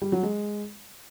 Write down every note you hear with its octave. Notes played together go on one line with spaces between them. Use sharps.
G3
F#3
G#3